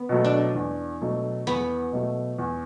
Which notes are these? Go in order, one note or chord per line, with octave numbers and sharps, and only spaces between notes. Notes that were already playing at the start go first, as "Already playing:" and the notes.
Already playing: B3
B2 F#3 A3
D4
E2
B2 F#3 A3
E2 B3
B2 F#3 A3
E2